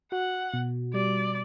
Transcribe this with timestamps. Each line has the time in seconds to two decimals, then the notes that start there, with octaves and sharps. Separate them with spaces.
0.12 F#4 F#5
0.54 B2
0.94 G3 D5